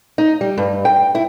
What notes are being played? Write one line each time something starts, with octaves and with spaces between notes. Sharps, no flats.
D#4
G3
G2
G5
E4